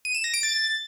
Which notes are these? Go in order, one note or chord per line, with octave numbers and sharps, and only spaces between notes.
D#7
E7
A#6
D7
A6